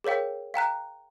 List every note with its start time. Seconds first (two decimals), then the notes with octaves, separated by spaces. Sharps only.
0.04 G#4 A#4 C#5 F5 G5
0.54 F5 G5 A#5 F#6